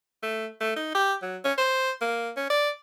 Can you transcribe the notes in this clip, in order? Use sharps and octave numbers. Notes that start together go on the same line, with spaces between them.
A3
A3
D#4
G4
F#3
C#4
C5
A#3
C#4
D5